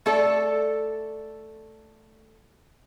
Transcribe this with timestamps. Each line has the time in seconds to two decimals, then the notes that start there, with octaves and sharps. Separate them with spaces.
0.06 A3 A4 D5